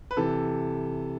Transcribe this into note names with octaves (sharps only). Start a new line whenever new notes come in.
B4
C3 E3 A4